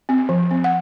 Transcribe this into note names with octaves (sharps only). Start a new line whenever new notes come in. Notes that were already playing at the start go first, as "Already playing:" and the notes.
C4
F3
C4
F#5